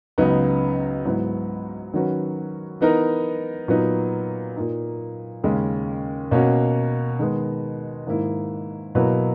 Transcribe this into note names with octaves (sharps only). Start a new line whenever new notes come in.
C#2 C#3 F#3 B3 D#4
G#2 F#3 B3 E4
D#3 F#3 C#4 F#4 B4
E3 B3 D#4 A#4
A#2 F#3 B3 D#4
A#2 A#3 D#4
D#2 C#3 G#3 C#4
B2 A#3 C#4 F#4
D#3 G#3 B3
G#2 D#3 A#3 E4
B2 F#3 A#3 E4 B4